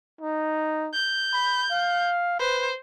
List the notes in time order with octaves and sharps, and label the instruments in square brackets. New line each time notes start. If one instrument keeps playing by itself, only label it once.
[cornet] D#4
[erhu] G6
[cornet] B5
F5
[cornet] B4 [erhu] C5